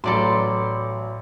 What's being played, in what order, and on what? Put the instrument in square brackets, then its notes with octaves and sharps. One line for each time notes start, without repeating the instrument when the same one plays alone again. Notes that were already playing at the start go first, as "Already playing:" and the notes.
[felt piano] A1 F#3 B5 [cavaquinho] A4 D5 C6